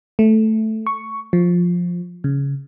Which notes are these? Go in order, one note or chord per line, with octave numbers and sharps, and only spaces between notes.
A3
C#6
F3
C#3